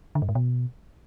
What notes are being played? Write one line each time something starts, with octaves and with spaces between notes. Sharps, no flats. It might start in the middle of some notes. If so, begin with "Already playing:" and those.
D3
G2
G#2
B2